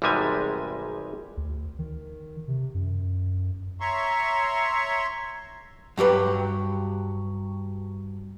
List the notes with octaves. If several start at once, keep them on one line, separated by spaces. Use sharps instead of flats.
G#1 E2 C3 G3 G#3 G#5
D2
D#3
C3
F#2
C#5 E5 A#5 C6 C#6
G2 F#3 G4 B4